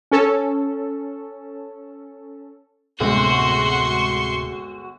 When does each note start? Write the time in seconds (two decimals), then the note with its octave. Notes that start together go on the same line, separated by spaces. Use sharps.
0.11 C#4 A4
3.00 D1 G1 A2 C3 G#3 F#4 C6 C#6